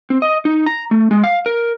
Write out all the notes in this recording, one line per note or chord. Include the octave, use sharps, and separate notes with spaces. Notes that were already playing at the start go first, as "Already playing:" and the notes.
C4
D#5
D#4
A#5
A3
G#3
F5
A#4